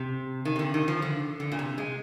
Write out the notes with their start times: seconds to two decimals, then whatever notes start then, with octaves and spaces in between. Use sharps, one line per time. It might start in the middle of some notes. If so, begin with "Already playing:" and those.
Already playing: C3
0.45 D#3
0.56 C3
0.59 D3
0.74 D#3
0.88 F3
1.02 D3
1.40 D3
1.52 A#2
1.59 C3
1.78 G#3